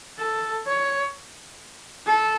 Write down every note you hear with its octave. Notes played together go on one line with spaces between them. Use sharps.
A4
C#5
A4